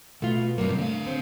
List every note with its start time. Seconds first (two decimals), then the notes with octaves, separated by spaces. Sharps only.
0.22 B2 A3 F4
0.58 G2 C3 F#3 A#3 C4
0.78 D3 A3 F5
1.07 C4